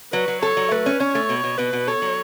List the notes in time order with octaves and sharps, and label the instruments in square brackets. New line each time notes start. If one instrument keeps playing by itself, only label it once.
[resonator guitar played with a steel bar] F#3 [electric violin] B4
[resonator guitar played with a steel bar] F#3
[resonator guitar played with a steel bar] A4 [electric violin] C#5
[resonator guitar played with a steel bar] F#3
[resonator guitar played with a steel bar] A3 [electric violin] B4
[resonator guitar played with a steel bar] C#4
[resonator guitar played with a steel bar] C#4 [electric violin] C#5
[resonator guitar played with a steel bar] A3
B2
B2
[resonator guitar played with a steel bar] B2 [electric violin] B4
[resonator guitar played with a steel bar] B2
[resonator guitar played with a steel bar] A4 [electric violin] C#5
[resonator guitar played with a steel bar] F#3